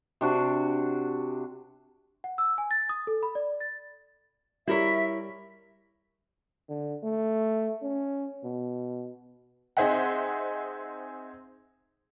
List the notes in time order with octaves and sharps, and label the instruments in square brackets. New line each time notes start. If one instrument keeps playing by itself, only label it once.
[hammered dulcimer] C3 D4 F#4
[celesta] F#5
E6
G#5
A6
D#6
A4
B5
D5
A6
[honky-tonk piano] G3 [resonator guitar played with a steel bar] E4 A#4 C#5 [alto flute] E5
[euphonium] D3
A3
C#4
B2
[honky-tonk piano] C4 D#4 G#4 C5 E5 F#5